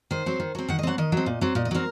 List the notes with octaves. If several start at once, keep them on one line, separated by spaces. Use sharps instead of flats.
D#3 C5
F#3 C4
D#3
F#3 C4
D#3 F#5
D#5
F#3 C4 F#5
D#3 D#5
F#3 C4
A#2
F#3 C4
A#2 D#5
D#5
F#3 C4 A#4